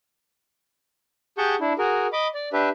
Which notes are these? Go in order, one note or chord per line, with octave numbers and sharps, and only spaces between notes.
G4 G#4 F#5 A5 C#6 G6
D4 E4
F#4 G#4 A#4
D#5 B5 D6
D5
D4 G4 B4 E5